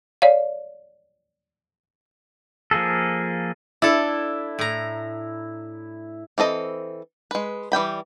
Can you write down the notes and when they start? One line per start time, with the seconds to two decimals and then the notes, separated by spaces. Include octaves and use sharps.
0.22 C#5 D5 F5
2.71 F3 A#3 G#4 A4
3.82 D4 E4 A4
4.59 A2 A#5
6.38 E3 C4 A4 D#5
7.31 G#3 B4
7.72 E3 G3 G5 B5